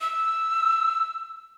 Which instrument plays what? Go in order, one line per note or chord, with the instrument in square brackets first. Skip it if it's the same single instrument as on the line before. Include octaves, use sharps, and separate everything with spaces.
[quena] E6